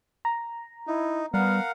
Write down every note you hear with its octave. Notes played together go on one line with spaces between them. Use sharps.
A#5
D#4 E4
G3 B3 A#4 F5 F#5